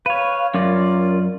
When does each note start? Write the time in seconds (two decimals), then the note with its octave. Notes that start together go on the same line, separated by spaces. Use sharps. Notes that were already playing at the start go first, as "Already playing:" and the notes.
0.06 B4 C#5 F5
0.54 F#2 C#4 F4 A#4 D5